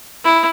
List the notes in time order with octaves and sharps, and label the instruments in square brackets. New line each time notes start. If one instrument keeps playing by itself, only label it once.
[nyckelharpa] E4